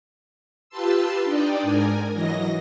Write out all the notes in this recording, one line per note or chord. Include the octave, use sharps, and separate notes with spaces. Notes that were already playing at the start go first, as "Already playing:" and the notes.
F4 G4 B4 A5 C6 E6
D4 D#4 D5 D#5 G5
G#2 A#4 G#5
E3 F#3 D#5 A#6